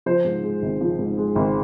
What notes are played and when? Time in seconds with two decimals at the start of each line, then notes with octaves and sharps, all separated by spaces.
0.06 F3 C5
0.24 G#2
0.43 G#3
0.62 G#1
0.81 F3
0.99 G#2
1.17 G#3
1.36 G#1